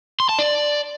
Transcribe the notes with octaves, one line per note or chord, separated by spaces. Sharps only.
C6
A5
D5